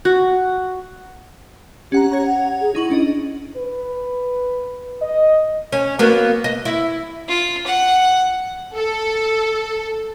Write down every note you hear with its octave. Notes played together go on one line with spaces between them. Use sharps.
F#4
C#4 G4 F#5 A#5
C#5 A#5 G#6
F#5
G#4
D#4 E4 C#6 F#7
C#4 D4 D#5
B4
D#5
C#4
F#3 A#3 B3
D#5
E4
F4
F#5
A4